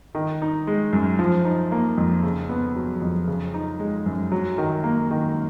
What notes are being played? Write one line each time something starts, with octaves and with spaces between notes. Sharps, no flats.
D#3
D#4
G#3
F#2
F3
D#4
A#3
F2
C#3
B3
F#3
F2
C#3
D#4
G#3
F#2
F#3
D#3
A#3
D#3